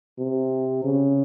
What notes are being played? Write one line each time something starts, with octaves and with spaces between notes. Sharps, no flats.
C3
C#3